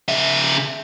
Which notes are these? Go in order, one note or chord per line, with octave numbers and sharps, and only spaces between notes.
C#3 E5